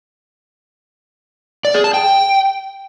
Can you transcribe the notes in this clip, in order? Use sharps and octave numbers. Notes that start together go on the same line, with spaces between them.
D5
G#4
A5
G5